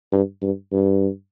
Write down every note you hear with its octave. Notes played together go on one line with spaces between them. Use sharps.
G2
G2
G2